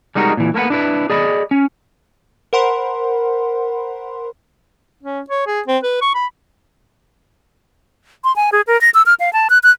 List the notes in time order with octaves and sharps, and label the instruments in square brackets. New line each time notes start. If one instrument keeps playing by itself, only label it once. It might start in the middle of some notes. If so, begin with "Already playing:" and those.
[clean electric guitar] G3 G#3 D#4 F#4 G#4 A#4
A#2 E3
A3 A#3 A#4 B4 F#5
D4 E4 B4
G#4 D5 D#5 B5
C#4
[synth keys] A#4 C5 F#5 B5 C6
[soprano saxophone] C#4
C#5
G#4
C4
B4
C#6
B5
[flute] C6
G#5
G#4
A#4
A#6
E6
F6
F5
A5
F#6
F#6